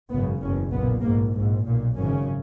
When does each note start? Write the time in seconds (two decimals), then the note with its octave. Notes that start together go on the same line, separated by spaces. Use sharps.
0.10 G#1 F#2 C#3 B3
0.40 F#1 E2 B2 C#4
0.72 B1 A#2 B3
1.02 A#1 G#2 A#3
1.34 A#1 G#2
1.65 B1 A#2
1.95 G#1 F#2 C#3 C#4